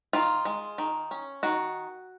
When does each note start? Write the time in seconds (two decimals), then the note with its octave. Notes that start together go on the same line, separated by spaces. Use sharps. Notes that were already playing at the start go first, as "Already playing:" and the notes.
0.13 D#3 F4
0.45 G#3
0.78 D#3
1.11 C#4
1.43 D#3 F#4